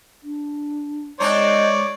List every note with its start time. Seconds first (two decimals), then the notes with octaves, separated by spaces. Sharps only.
0.23 D4
1.20 G#3 C4 D4 D#4 C#5 D5